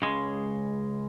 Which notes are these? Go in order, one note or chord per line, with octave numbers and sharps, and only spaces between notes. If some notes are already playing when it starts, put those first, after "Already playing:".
C#2 C#3 G#3